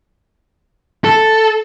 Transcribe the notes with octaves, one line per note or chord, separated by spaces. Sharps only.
A4